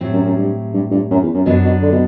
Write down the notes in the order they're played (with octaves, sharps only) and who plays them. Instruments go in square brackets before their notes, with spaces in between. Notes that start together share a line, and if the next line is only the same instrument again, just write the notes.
[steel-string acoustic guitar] A2 F#3 C4 G4
[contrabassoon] F#2
F#2
G2
G2
G2
F#2
E2
F#2
[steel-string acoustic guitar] F#2 F#3 B3 D4 [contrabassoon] B2
[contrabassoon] B2
D3
B2